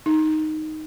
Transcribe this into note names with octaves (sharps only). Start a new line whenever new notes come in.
D#4